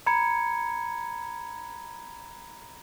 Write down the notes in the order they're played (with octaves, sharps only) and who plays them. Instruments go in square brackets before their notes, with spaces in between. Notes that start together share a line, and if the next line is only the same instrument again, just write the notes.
[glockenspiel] A#5 B5 G#6 C#7